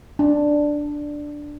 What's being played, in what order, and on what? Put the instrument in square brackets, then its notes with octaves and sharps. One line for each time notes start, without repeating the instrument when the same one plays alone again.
[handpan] D4